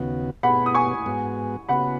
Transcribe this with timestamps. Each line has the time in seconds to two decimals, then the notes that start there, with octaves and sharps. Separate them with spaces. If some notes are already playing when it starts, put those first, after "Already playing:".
Already playing: D#2 C#3 B3 F#4
0.43 B2 B3 G#4 F#5 B5
0.66 D#6
0.75 G#5 C#6
1.06 G#2 G#3 B3 F#4
1.69 C#3 B3 F#4 F#5 B5